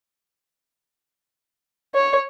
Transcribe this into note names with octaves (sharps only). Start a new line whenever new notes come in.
C#5